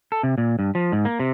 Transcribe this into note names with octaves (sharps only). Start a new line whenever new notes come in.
A4
C3
A#2
G2
F3
G#2
A#3
C3